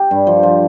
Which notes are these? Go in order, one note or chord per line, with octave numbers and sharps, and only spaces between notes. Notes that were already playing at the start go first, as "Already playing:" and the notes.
Already playing: G4
G2
F3
F3